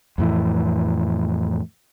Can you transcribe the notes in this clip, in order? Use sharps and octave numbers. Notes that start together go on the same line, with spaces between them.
F2 A2 E3